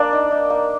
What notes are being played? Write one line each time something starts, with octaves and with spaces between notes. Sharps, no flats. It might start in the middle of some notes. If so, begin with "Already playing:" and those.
Already playing: A#3 D4 D5
D#4
D#4
A#3